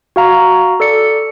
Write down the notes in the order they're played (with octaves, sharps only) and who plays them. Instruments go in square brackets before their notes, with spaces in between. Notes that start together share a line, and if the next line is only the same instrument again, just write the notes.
[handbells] F#4 F5 A#5
A4 D5 C#7